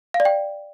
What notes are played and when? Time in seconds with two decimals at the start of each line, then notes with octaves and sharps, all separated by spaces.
0.14 F5
0.20 D5
0.25 G5